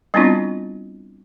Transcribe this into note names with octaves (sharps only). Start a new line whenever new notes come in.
G3 B3 C4 D4 E4 F4